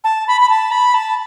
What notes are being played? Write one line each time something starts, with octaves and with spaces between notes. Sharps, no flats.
A5
B5
B5
A5
B5
A5